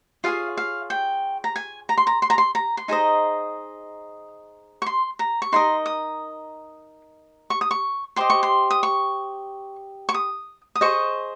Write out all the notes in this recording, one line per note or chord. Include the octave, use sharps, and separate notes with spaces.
F4 G#4 C#5 F5
F5
G5
A#5
G#5
A#5
C6
A#5
C6
A#5
C6
A#5
C6
D#4 G#4 C5 D#5 A#5
C#6
C6
A#5
C#6
D#4 A#4 D#5 C6
D#6
C#6
D#6
C#6
G4 C5 D#5 C6
C#6
C6
D#6
C#6
C#6
D#6
D#6
G#4 C5 D#5 C#6